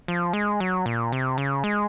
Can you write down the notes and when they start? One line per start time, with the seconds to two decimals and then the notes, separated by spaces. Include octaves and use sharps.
0.08 F3
0.33 G#3
0.60 F#3
0.86 A#2
1.12 C3
1.38 C#3
1.64 G#3